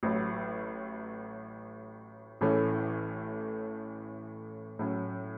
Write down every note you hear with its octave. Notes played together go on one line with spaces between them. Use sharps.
A1 A2 F#3
A1 A2 E3 A3 C#4
A2 F#3 C#4